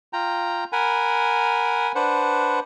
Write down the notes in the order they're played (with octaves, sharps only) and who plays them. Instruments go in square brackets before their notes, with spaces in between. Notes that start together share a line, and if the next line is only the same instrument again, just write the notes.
[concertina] F4 G5 A#5
A#4 F#5 G#5 B5
D4 B4 C5 F#5